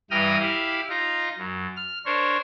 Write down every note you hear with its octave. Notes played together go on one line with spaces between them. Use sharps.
G2 E3 G5 A#5 D#6 F6
E4 G4 F5
D#4 F4 A#5
F#2
F6
D4 A#4 C5 C#5